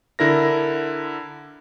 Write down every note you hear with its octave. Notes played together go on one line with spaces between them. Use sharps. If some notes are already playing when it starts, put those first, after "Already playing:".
D3 E4 A#4 A#6